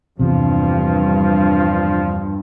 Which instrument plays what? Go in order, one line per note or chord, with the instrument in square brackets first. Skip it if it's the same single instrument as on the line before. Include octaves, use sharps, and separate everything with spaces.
[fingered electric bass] E2 C3 [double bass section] G2 [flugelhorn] F3